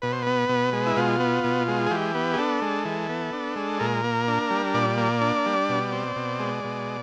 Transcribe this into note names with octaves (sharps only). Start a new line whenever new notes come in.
B2 B4
C5
B3 B4
B2
G#3
E4
B2 F4
B3
B2
G#3
G#4
E3 G4
B3
G#4
D4 A4
G#3
E3
B3
D4
G#3
A#2 A#4
A#3
D4
G3
A#2 D5
A#3
D4
G3
B2
C4
B2
G#3
B2